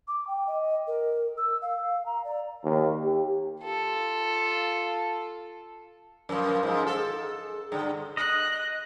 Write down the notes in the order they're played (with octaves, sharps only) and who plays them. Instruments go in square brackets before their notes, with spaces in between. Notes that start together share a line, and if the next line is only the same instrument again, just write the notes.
[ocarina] D6
G5
D#5
A#4
E6
F5
A#5
D5
[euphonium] D#2
G4
[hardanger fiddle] F4 A4
[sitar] F#2 F3 [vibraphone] A#4
[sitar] G#2 F3
[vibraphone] G#4 [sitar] A4
[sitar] G2 D3
[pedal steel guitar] D#5 [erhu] F#6